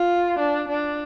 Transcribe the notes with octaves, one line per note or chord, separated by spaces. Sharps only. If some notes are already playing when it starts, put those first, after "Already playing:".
Already playing: F4
D4
D4